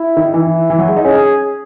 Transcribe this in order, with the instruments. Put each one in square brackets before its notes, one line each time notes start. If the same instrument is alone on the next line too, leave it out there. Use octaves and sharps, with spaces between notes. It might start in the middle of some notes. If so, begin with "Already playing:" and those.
Already playing: [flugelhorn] E4
[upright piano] D#3
[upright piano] E3 [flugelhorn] E4
[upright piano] E3
F#3
G#3
D#4
[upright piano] C#4 [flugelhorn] G#4